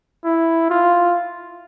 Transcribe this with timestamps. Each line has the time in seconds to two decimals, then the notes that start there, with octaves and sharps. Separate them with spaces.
0.25 E4
0.70 F4